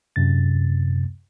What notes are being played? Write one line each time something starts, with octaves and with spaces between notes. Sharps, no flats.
F#2 C3 A6